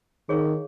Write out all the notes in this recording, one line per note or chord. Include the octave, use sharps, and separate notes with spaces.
D#3 G#4 C#5 F5 C#6